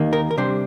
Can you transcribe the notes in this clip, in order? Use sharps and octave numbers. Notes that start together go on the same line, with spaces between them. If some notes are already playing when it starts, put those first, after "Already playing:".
Already playing: D#2 D#3 A#3
A#4
A#4
C3 G3 D4 C5